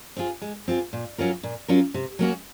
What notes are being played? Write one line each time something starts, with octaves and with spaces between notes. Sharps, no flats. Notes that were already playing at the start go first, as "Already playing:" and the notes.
C4 F4 G#4
G#3
C4 F4 G#4
A#2
F#3 C#4 F4 A#4
A#2
F#3 C#4 F4 A#4
C3
F#3 A#3 C#4 F#4